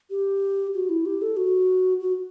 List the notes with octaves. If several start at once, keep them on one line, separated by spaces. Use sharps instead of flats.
G4
F#4
E4
G4
A4
F#4
F#4